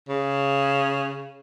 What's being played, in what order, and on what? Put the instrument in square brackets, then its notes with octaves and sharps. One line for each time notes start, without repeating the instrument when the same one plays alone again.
[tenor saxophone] C#3